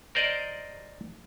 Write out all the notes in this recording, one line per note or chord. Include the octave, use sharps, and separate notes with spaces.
A#4 C5 D5 D#5